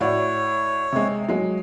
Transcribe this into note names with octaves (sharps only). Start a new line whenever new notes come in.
A2 F#4 C#5 D5
C3 G#3
F#3 G#3